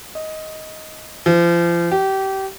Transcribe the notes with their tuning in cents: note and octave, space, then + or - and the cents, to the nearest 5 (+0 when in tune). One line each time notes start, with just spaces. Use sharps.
D#5 +10
F3 -35
G4 -25